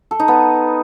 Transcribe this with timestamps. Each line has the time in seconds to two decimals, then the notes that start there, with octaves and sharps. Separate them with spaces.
0.11 A4
0.19 D#4
0.28 B3